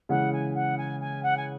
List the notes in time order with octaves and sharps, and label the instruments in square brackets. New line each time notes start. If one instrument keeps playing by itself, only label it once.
[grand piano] C#3 E3 G#3 [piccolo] F#5
[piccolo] G#5
F#5
G#5
G#5
F#5
G#5